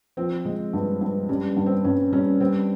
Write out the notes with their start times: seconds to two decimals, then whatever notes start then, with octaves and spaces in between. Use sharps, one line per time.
0.17 F3 C4
0.45 G#3
0.73 G2
1.01 G2
1.29 G3 C#4
1.56 G2
1.66 C4
1.84 G2 C#4
2.12 G3 C#4
2.40 G3 C4